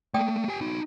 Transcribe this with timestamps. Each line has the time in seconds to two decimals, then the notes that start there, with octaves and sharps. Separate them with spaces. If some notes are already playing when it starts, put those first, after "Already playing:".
0.14 A3 A#3 D5 G5 D#6
0.48 G4 G#5
0.61 D#4 F#4